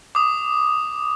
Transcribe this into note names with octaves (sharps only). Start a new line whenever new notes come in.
D6 D#6